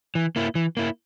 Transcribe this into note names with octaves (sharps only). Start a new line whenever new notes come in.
E3
A#3 E4
E3
A#3 E4